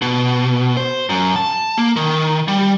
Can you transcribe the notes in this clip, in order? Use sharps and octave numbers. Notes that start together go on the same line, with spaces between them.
B2
C5
F#2
A5
A#3
D#3
G3